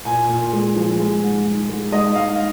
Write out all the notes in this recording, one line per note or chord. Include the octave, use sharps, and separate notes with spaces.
A#2 G#5
A#2
G#3
F3
G#3
G#2
G#2
G#3
G#2 D#5
G#2 F5